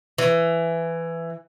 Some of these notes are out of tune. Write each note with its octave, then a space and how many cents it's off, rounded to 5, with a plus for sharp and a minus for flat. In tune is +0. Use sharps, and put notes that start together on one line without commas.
E3 +15